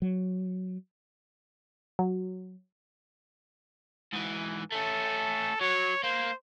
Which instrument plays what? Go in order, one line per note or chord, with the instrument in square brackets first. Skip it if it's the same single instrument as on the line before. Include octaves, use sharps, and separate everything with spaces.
[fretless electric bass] F#3
[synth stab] F#3
[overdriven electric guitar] G#2 E3
[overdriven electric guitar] A3 C#4 [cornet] A4
[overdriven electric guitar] F#3 [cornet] C#5
[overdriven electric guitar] A#3 [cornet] C5